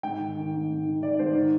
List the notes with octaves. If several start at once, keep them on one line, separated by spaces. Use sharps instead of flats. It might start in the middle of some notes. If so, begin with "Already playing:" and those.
G#2 G5
D#3
D#3
G#2
G#2
D#3
D#3 D5
G#2 C5
D#3